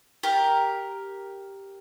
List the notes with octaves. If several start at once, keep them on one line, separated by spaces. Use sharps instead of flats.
G4 A#4